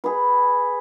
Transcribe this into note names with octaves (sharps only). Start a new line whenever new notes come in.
G#4 B4